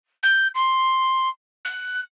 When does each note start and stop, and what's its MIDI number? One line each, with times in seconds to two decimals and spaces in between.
0.23 0.47 91
0.54 1.29 84
1.65 2.00 90